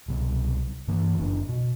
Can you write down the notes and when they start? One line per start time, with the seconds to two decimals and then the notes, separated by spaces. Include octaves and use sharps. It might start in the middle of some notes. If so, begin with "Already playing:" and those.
0.08 C2 B2
0.88 G2 E3 A#3
1.18 F#1 C4 D4
1.48 B2